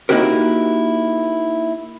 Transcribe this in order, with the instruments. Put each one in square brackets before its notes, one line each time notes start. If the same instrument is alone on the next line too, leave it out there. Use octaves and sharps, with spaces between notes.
[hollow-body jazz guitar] A#3 D#4 E4 F#4 G4 A#4